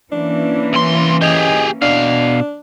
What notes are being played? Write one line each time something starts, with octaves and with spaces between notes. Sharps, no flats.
E3 A#3 C#4 D4
C2 C6
G4 G#4 D#5
B2 D4 F5